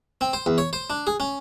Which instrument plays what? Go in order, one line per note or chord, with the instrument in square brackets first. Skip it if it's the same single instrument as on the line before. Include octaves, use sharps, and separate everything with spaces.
[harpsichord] C4
C5
E2
C#5
C5
D4
G#4
C#4